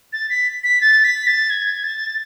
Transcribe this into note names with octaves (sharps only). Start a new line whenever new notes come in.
A6
B6
B6
A6
B6
A6
G#6
A6